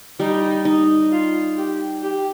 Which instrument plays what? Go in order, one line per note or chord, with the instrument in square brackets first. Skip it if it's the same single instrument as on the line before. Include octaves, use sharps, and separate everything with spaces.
[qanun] G3 [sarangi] D#4
[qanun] D#4
[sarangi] F4
G4
G4